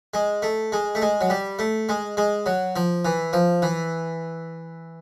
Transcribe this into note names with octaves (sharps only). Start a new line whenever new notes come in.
G#3
A3
G#3
A3
G#3
F#3
G3
A3
G#3
G#3
F#3
F3
E3
F3
E3